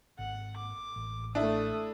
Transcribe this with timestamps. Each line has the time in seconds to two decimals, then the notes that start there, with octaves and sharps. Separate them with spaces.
0.19 G#1 F#5
0.57 D6
0.96 A1
1.35 A3 D4 E4 D#6